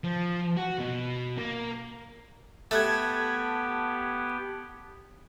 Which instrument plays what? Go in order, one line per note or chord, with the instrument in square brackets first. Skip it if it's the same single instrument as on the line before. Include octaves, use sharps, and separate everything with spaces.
[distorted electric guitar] F3
F#4
B2
A#3
[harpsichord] A3 [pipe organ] B3 G4 [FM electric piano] A5 F#6 G#6